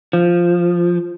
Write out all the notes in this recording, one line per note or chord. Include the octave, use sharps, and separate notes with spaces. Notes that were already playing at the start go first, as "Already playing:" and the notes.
F3